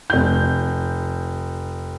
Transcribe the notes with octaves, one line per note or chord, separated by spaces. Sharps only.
F1 G6